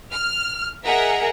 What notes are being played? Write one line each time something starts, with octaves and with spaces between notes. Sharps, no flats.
F6
G#4 A#4 D#5 E5 F#5 A#5